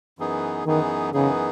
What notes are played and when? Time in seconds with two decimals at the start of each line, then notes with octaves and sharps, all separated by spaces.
0.19 F#2 E3 B3 D#4 G#4
0.66 F#2 D#3 E3 B3 D#4 G#4
1.13 F#2 C#3 E3 B3 D#4 G#4